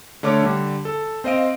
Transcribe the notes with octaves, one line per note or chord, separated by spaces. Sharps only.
D3 A3 C#5 D6 F6
D3 G3
A4
C4 C5 D#5 F5 D7